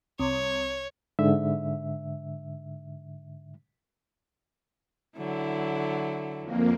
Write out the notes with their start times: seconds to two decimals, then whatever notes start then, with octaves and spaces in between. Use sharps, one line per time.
0.20 C2 C#5
1.19 G#2 D3 E5
5.17 D3 F#3 E4
6.41 F2 A#3